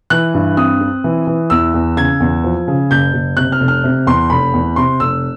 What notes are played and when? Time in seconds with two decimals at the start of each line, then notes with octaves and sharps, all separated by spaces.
0.10 E3 F#6
0.34 G2
0.57 C4 D#6
0.81 C4
1.04 E3
1.27 E3
1.50 E2 E6
1.74 E2
1.97 C#3 G#6
2.20 E2
2.44 F3
2.68 C#3
2.91 F#1 G6
3.13 F#1
3.37 C3 F#6
3.52 F6
3.60 F1
3.68 F6
3.84 C3
4.07 E2 C6
4.30 F1 B5
4.53 E2
4.76 C3 C6
5.00 F1 E6